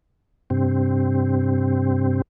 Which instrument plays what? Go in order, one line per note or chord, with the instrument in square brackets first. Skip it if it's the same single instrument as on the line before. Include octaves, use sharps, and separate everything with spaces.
[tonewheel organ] G2 C3 C4